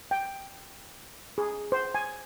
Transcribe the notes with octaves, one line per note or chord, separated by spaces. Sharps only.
G5
G#4
C5
G#5